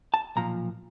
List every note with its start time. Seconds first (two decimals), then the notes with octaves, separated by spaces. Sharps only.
0.14 A5
0.36 B1 A#2 F3 A#5